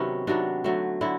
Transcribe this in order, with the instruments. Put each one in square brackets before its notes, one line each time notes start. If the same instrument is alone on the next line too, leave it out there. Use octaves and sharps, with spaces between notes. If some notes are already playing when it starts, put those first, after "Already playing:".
Already playing: [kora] C3 D#3 F#3 B3 C#4
C3 D#3 F#3 B3 D4
D3 F#3 A3
D3 F#3 E4